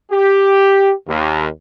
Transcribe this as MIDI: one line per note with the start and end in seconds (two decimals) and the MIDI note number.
0.10 0.92 67
1.07 1.47 39